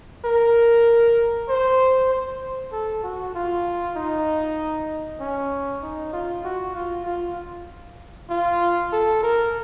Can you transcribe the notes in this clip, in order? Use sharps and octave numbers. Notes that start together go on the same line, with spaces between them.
A#4
C5
C5
A4
F#4
F4
D#4
C#4
D#4
F4
F#4
F4
F4
F4
A4
A#4